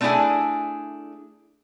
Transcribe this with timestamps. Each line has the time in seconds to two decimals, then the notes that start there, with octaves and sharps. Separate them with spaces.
0.01 A3 C4 D4 E4 G#4 G#5